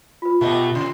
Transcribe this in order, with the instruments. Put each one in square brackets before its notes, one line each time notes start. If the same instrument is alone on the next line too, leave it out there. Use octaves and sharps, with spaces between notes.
[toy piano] F4 B4
[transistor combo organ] B2 [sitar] A3 G4 D#5
[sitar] C#3 [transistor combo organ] C6